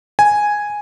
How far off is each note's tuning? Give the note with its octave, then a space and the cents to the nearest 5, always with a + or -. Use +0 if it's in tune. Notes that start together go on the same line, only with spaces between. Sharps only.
G#5 +0